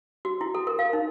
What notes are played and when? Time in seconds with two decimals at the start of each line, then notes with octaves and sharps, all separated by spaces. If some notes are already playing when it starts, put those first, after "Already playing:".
0.25 F#4
0.41 E4
0.55 A4
0.67 A#4
0.79 F5
0.93 D#4